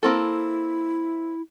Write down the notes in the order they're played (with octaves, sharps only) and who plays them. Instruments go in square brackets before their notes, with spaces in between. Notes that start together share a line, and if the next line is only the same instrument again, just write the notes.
[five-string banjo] A#3 C4 A4 [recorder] E4